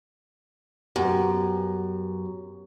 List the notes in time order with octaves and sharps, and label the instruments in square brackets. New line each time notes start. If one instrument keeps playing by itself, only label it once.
[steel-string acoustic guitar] F#2 [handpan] B3 G4